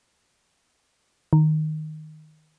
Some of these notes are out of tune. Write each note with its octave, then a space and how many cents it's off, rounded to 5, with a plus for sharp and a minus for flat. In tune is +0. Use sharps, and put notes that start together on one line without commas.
D#3 -5